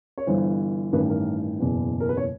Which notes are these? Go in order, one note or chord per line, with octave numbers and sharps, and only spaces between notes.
C#5
G1 G2 E3 C5
A1 G2 D#3 B4
A#4
F#1 E2 B2
A#4
B4
C#5